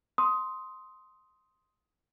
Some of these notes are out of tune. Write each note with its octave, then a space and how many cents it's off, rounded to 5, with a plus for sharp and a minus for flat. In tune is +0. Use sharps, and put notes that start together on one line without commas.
C6 +0 D#6 +15